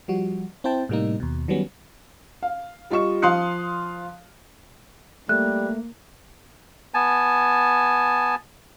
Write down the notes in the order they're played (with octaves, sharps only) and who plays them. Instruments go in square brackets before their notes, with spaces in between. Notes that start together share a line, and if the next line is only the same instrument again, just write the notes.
[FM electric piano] F3 G3 F#4
C4 E4 C5 G5 A5
A2 C3 G3 A#3 D#4
D#2 B2
D#3 F#3 G3 B3 C#4
[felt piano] F5
G3 F4 D#5 C#6 E7
F3 F5 C6 D#6 F#6 C#7
[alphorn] G3 [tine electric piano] A3 [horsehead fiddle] A#3 [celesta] F#6
[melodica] B3 G#5 A5